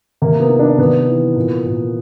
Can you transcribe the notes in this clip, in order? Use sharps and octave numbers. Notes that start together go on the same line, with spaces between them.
C3 A#3
B3
D#3
D4
C3 B3
E3
A#2
A#2